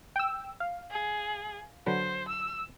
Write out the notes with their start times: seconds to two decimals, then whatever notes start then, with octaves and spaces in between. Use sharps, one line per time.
0.16 G5 E6
0.60 F5
0.91 G#4
1.86 D3 F#3 B4 C5
2.28 E6